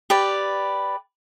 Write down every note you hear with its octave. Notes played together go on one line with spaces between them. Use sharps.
G4 B4 D5